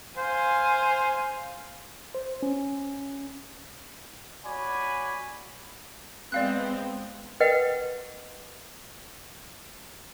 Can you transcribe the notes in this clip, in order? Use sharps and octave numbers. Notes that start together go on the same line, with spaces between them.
C5 F5 G#5
C5
C#4
F#4 C#5 D5 G#5 B5
G#3 B3 C4 D5 F5 F#6
A#4 B4 D#5 F#5 G5